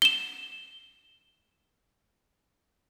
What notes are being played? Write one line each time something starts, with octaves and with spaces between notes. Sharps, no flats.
E7 G7